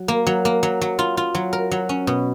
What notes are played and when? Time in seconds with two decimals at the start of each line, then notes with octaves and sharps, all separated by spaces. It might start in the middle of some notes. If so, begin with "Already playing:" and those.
Already playing: F#3
0.08 A#3
0.27 F#3
0.45 A#3
0.63 F#3
0.81 F#3
0.99 F4
1.17 F4
1.35 F#3
1.53 A#4
1.71 F#3
1.89 C#4
2.07 B2